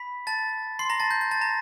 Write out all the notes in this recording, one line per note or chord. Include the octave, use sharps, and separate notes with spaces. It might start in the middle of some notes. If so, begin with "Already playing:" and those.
Already playing: B5 B6
A5 A6
C6 C7
A#5 A#6
A5 A6
G6
G6
A5 A6
A#5 A#6